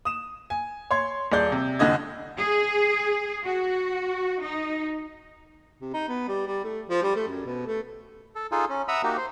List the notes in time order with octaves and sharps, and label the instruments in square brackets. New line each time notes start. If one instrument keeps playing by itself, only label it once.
[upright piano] D#6 E7
G#5
C#5 C6 G#6
D#1 G#4 D5 G6
C3
C2 F2 D3 D#5 G#6
[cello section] G#4
F#4
D#4
[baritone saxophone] C3
D#4
B3
G3
G3
A3
F3
G3
A3
F#2
B2
A3
[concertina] A4
D#4 F4 G#4 A4
C#4
E5 F#5 A#5 B5 D#6 E6
A#3 D#4 F#4 G4
C5